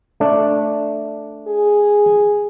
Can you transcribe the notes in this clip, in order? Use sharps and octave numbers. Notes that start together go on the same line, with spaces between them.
A3 D4
G#4